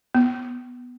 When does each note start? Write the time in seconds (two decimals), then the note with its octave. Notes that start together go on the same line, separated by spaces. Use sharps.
0.15 B3